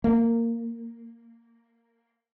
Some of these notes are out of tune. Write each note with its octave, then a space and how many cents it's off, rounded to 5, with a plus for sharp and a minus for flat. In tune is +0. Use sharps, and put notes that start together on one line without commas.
A#3 -10